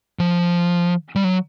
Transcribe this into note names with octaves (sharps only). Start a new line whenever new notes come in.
F3
G3
F#3